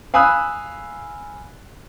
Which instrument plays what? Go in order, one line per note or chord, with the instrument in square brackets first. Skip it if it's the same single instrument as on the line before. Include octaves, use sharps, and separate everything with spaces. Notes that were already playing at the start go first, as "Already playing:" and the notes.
[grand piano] F5 G#5 B5 D#6 E6 F#6